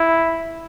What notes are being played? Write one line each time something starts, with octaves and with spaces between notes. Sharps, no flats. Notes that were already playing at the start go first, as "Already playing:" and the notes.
Already playing: E4